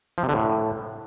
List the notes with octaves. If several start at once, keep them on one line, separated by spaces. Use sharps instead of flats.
F3
C3
D3
A2